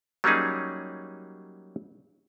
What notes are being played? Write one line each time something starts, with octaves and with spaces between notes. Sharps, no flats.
F#3 G3 A#3 C#4 D#4 G#4